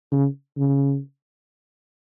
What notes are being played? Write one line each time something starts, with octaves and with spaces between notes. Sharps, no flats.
C#3
C#3